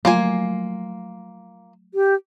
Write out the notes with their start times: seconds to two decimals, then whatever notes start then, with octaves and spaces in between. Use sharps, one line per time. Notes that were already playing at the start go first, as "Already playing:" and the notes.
0.05 F3 F#3 A3 A#3 F4 G#5
1.94 G4